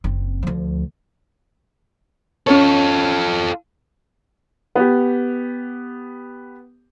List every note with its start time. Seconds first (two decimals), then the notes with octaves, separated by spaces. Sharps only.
0.04 F#1 C4
0.43 D2 F3
2.47 C#4 F4 A4 C#5
4.75 B3 G4